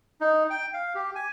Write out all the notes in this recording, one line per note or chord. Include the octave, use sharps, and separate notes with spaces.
D#4
G5
F5
G4
G#5